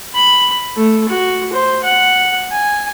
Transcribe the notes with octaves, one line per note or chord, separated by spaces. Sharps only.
B5
A3
F#4
C5
F#5
G#5